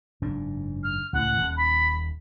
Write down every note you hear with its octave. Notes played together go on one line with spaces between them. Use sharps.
F#1 G#2 D4
F6
C#2 A2 F#5
D#1
B5